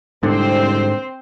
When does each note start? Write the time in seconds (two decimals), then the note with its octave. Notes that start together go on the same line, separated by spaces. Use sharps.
0.23 C2 G#2 D3 C4 C5